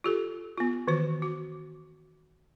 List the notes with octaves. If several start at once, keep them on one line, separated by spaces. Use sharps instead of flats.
F4 G4 A4
B3 F4
D#3 E3 F#4 C5
F#4